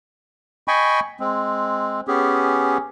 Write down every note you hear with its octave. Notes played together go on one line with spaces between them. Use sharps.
D#5 G5 G#5 B5 C#6
G#3 C4
B3 C#4 G4 G#4